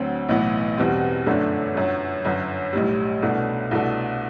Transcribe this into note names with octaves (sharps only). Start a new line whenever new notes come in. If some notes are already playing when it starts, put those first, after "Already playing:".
Already playing: D2 D3 F#3 C4
B1 A2 E3 B3
E2 B2 G3 C4
G1 F#2 D3 A3 D4
G1 F#2 F#3
G1 F#2 D3
B1 A2 G3
C2 B2 A3 D4
C2 B2 A3 D4 A4